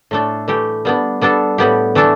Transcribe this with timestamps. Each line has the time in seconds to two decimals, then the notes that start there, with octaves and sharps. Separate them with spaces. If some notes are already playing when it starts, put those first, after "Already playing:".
0.11 A2 A3 D4 A4
0.48 E3 A3 G4
0.85 G3 B3 D4
1.21 G3 B3 D4 A4
1.58 A2 G3 B3 G4
1.95 E3 A3 D4 A4